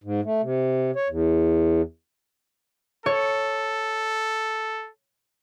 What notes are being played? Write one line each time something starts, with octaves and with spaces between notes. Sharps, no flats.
G#2
A3
C3
C#5
E2
A4 C#5